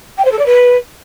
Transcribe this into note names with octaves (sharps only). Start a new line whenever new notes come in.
G5
C5
A4
D5
B4